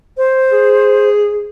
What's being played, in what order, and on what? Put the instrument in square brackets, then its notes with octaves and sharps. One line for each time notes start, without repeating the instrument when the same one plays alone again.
[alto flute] C5
[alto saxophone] G#4